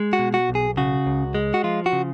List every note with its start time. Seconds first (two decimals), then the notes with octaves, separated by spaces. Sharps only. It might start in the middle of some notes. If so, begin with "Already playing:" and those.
Already playing: G#3
0.13 F#4
0.19 B2
0.34 F#4
0.49 B1
0.55 G#4
0.77 C#3 F#4
1.06 C#2
1.35 G#3
1.54 F#4
1.64 F3 F4
1.86 F#4
1.93 C#3